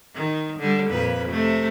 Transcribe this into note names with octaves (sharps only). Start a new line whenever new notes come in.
D#3
D3 G3
F2 A#2 B4
C3 A3